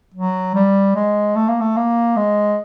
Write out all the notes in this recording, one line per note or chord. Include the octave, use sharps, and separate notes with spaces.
F#3
G3
G#3
A3
A#3
A3
A#3
G#3